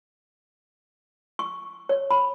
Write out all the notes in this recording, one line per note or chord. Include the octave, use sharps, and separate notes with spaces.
C#6
C#5
B5